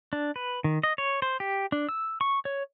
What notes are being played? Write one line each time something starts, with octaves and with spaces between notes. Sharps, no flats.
D4
B4
D#3
D#5
C#5
C5
G4
D4
E6
C#6
C#5